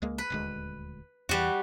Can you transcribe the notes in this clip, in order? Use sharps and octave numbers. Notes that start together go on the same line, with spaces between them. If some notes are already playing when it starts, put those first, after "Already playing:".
C#2 G#3 A#3
B4
D#1 D2 G#3
E2 E3 G3 F#4